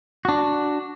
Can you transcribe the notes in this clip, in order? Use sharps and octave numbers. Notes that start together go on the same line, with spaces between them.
D4 F#4